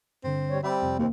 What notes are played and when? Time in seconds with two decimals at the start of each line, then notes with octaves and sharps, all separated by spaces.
0.24 G2 D3 C4
0.50 G3 C#5
0.63 G3 C4 E5 B5 D6
0.82 F2 C3
0.99 D#2 C3 D#3 A#3 C4